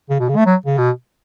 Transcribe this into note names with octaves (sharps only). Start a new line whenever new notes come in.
C#3
B2
C#3
A3
F#3
C#3
B2